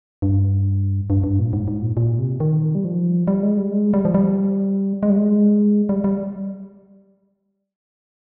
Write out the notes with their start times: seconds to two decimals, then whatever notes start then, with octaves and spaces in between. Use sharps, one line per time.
0.22 G2
1.10 G2
1.24 G2
1.39 A#2
1.53 G#2
1.68 G#2
1.82 A#2
1.97 A#2
2.19 C3
2.40 D#3
2.75 G3
2.85 F3
3.27 G3
3.43 G#3
3.57 G3
3.71 G#3
3.94 G3
4.05 F3
4.14 G3
5.03 G#3
5.10 G3
5.16 G#3
5.89 G3
6.04 G3